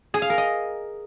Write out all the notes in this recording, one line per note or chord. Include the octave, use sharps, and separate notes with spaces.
G#4
F5
A#4
D#5